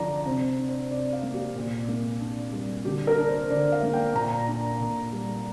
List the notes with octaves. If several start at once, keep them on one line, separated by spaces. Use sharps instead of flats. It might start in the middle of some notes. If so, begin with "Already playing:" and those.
Already playing: D3 F3 D5 A#5
C3 C5
D4
C5
C3 D5
F5
A#3
G4
A#2
A#3
D4
G3
D3 G4
A#4
D4
C5
D3 D5
F5
A#3
G5
A#2 A#5
D4
A#2
G3